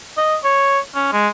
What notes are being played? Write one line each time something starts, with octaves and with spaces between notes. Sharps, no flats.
D#5
C#5
C#4
G#3